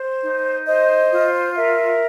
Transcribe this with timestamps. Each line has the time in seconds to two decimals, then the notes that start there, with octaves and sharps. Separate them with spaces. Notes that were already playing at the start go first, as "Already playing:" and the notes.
Already playing: C5
0.22 D#4
0.66 C5 D#5
1.12 F4
1.56 A#4 E5